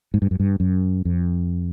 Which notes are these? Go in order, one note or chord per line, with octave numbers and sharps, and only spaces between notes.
G#2
G2
F#2
G2
F#2
F2